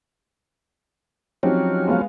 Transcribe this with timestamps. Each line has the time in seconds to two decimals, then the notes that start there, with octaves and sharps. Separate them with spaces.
1.43 F3 F#3 C4 C#4 D#4 G4
1.87 G#3 B3 F5